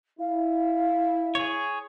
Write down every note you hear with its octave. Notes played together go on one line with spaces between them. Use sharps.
E4 F5
G#4 C#5